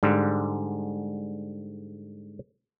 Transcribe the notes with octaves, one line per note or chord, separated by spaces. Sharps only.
G#2 D3 G3